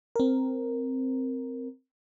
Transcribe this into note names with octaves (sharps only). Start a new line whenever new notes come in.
C4 A#4